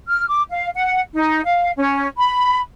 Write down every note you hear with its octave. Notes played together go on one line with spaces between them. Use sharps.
F6
D6
F5
F#5
D#4
F5
C#4
B5